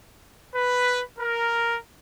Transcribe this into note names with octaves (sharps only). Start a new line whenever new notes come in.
B4
A#4